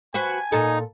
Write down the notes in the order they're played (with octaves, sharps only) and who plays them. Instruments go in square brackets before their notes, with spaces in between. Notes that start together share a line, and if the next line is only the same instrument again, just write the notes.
[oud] F#4 B4 C5 [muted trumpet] G#5
[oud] A#2 A4 [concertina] D#4